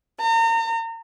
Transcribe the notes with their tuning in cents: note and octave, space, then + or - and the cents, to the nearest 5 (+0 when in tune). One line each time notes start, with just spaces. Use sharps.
A#5 -35